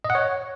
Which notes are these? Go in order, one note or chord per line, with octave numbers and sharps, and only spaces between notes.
D#5
F#5
C#5